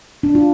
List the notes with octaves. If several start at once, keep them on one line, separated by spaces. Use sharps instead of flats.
D4
F4